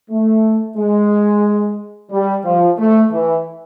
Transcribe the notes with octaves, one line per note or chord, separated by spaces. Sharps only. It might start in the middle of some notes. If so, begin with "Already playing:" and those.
A3
G#3
G3
F3
A3
E3